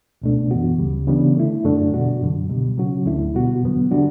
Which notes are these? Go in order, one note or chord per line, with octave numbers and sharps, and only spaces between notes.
C#2 B2 A3 D4
F#2 E3 B3 F#4
D2 C#3 G3
C#3 E3 G3 B3 D4
D3 A3 E4
F#2 D3 A3 D4 F#4
E2 B2 G3 D4 F#4
F#2 D3 F#3
C#2 B2 G3
C#3 F#3 C#4 F#4
D2 D3 A3 E4
B2 G3 B3 F#4
E2 D3 F#3 B3
D3 G3 D4 F#4